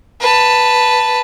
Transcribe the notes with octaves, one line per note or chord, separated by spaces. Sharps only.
B4 A5